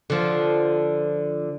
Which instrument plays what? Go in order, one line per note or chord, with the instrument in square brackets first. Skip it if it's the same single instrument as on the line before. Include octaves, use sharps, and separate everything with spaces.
[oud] D3 F3